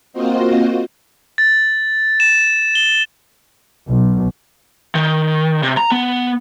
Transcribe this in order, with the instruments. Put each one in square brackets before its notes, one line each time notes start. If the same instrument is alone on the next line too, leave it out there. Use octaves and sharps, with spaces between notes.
[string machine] A#3 C4 F4 F#4 C5 D#5
[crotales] A6
E7
G7
[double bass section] B1
[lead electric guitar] D#3
C3
A#5
B3